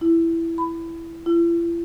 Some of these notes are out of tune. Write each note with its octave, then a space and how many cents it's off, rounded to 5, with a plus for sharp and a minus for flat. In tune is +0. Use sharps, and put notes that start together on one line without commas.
E4 +10
B5 +20
E4 +45